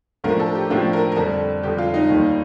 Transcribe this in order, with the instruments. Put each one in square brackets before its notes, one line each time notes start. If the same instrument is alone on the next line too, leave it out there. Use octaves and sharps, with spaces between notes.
[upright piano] A2 F3 A3 D4 F4 [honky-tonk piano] A#4
[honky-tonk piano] A4
G4
[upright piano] A2 F3 A3 D4 F4 [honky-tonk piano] G4
[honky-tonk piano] A#4
A#4
[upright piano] F2 D3 G3 [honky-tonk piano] A4
[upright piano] F2 D3 G3 [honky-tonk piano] G4
[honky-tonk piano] F4
D#4
[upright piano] D#2 D#3 G3